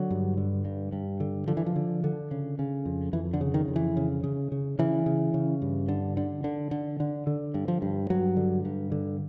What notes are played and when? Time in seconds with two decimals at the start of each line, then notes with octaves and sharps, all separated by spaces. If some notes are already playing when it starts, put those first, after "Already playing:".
Already playing: D3 F#3
0.11 G2
0.37 D3
0.65 G2
0.92 G2
1.20 D3
1.48 D3 F3
1.57 E3
1.66 F3
1.76 D3
2.04 D3
2.31 C#3
2.59 C#3
2.85 F2
3.13 F2 E3
3.33 D3
3.41 C#3
3.54 D#3
3.68 F2
3.76 E3
3.97 C#3
4.24 C#3
4.52 C#3
4.79 C#3 E3
5.06 C#3
5.34 C#3
5.62 G2
5.88 D3
6.17 D3
6.44 D3
6.71 D3
7.00 D3
7.27 D3
7.54 G2
7.68 F3
7.82 G2
8.10 G2 F#3
8.37 D3
8.65 G2
8.92 D3